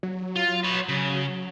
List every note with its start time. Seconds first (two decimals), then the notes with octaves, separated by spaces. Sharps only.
0.03 F#3
0.36 F4
0.64 B4 C#5
0.89 C#3